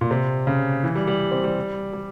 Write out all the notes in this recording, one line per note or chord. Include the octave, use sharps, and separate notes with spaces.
A#2
C3
C#3
E3
G3
G3
C4
G3
G3